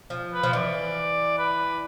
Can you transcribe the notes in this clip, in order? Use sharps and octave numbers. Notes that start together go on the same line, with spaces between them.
F3
B4
F3
E3 D5
B4